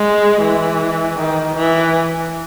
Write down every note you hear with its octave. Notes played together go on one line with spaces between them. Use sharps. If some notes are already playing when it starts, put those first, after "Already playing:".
Already playing: G#3
E3
D#3
E3